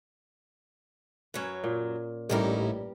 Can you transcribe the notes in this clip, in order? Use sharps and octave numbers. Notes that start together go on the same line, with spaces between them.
F#2 F#3 C#4 B4
A#2
A1 G2 G3 C#4 D#4 E4 A#4